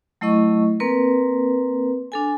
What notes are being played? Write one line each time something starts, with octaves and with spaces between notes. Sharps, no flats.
F#3 A3 E4 D#5 C#6
A#3 C4 A#4 B4
D4 A4 G#5